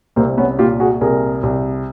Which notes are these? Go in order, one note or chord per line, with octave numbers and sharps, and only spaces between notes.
C2 A#3 C4
B3 C#4
A#2 F4 G4
F#4 G#4
C2 G#4 A#4
C2